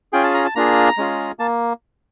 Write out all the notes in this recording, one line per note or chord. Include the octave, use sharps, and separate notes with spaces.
C#4 F4 G#4 G5
A5
A#5
A5
A#3 D4 F4 G#4 A#5
G#3 C#4 F4 G#4
A#3 A5